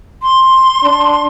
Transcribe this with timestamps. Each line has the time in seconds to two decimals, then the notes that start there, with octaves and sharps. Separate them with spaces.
0.22 C6
0.84 D4